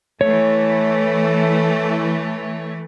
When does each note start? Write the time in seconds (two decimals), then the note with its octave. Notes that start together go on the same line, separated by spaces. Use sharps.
0.21 E3 A3 C#5